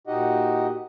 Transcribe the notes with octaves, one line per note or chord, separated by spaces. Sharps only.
A#2 D#4 F#4 G4 D#5 F#5